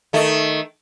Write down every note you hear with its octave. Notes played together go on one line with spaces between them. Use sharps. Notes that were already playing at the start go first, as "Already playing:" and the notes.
D#3 A3